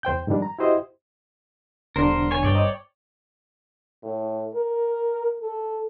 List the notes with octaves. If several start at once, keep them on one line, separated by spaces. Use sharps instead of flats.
E2 C5 G5 G6
G#2 D#3 F3 G3 D4
A#5
E4 F#4 G4 C5 D#5
E1 D3 G3 D4 A#4 C5
C#5 G#5
G1 G2 C#5 D5 G5
C5 D#5 A#5
A2
A#4
A4